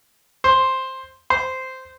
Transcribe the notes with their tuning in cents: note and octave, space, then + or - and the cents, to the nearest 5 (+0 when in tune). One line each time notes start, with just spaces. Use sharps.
C5 +5
C5 -10